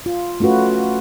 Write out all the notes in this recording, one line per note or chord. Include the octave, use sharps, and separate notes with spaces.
F4
A3 C#4 F4 F#4 B4